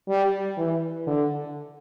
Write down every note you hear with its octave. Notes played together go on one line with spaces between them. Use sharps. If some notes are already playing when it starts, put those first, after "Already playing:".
G3
E3
D3